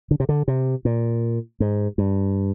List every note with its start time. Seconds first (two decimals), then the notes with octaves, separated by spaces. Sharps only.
0.11 D3
0.20 C3
0.29 D3
0.48 C3
0.85 A#2
1.60 G#2
1.98 G2